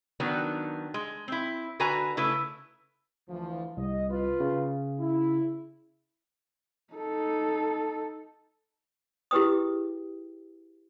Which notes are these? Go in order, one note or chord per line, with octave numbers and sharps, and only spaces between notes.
D#3 F#3 B3 D4
G#3
C4 E4
D3 F#4 B4 G#5 A#5
C#3 A3 E4 B4
D2 E3 F3
C2 D#5
F4 B4
C#3
E4
D#4 A4
E4 G4 G#4 B4 G5 D#6